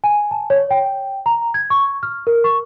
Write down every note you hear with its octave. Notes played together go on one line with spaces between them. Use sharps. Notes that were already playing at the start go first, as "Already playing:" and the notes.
G#5
A5
C#5
G5
A#5
G#6
C#6
F6
A#4
C#6